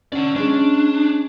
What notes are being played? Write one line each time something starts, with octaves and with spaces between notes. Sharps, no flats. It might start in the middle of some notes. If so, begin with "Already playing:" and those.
C#4 D5 F#5
G#3 C#4 D4